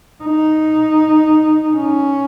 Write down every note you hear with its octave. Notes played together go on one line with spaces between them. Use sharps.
D#4
C#4